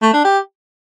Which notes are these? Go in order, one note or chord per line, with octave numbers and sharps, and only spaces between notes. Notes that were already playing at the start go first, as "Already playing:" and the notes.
A3
D4
G4